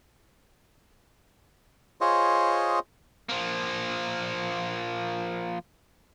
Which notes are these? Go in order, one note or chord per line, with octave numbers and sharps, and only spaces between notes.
F4 G#4 C5 C#5 D#5
F3 A#3